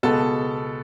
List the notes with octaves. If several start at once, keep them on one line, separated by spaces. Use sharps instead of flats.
C#2 B2 G#3 B3 A4 A5